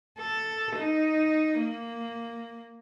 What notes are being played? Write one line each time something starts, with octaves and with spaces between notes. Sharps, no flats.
A4
D#4
A#3